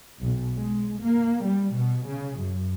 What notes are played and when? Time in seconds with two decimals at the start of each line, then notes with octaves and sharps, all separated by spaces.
0.21 B1
0.58 G#3
1.01 A#3
1.44 G3
1.74 B2
2.07 C#3
2.39 F#2